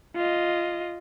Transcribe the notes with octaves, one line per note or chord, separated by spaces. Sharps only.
F4 D#5